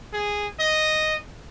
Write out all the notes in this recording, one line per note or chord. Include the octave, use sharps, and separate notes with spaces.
G#4
D#5